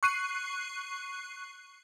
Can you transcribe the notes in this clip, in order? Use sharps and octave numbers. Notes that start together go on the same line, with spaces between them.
C#6 F#6 C7 D#7